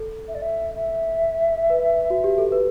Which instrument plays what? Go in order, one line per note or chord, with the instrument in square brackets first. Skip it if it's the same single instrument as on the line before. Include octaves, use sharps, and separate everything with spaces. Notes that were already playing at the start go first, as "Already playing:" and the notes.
Already playing: [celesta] A4
[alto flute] E5
D5
E5
E5
[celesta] B4
F#4
G4
A4
B4